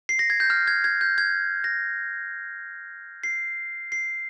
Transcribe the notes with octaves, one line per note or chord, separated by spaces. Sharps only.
C7
A#6
G#6
G6
F6
G#6
G#6
G6
G#6
A#6
C7
C7